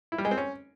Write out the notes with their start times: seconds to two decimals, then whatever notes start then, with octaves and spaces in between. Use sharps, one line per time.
0.12 E4
0.18 G3
0.25 G#3
0.31 C4
0.38 C#4